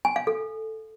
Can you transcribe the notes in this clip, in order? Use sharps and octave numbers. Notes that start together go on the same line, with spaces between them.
G#5
F5
A4